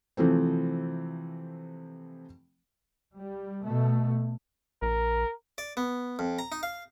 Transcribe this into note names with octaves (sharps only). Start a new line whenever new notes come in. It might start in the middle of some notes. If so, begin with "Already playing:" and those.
C3 E3 F3 A3 C4
G3
B2 A3
A#1 A#4
D5
B3
F2
A#5
D#4
F5